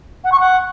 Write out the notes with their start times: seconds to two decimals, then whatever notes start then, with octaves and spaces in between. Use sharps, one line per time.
0.24 F#5
0.32 C#6
0.40 F#5